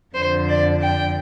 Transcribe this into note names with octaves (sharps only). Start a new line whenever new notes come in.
F2 D3 C5
D5
G5